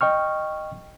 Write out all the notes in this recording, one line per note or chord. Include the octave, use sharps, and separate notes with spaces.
D#5 G5 C#6 F6